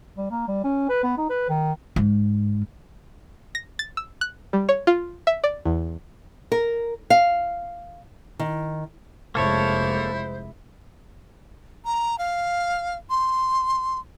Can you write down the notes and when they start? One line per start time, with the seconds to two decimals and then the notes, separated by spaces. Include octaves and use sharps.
0.17 G3
0.31 A#3
0.48 G3
0.64 C#4
0.89 B4
1.03 B3
1.17 D#4
1.30 B4
1.49 D#3
1.96 G#2
3.55 A#6
3.79 A6
3.97 E6
4.21 F#6
4.53 G3
4.69 C#5
4.87 F4
5.27 E5
5.44 D5
5.66 E2
6.52 A#4
7.10 F5
8.39 D#3
9.35 F1 G#3 A#3 E4 A4 C5 C#5
11.85 A#5
12.19 F5
13.10 C6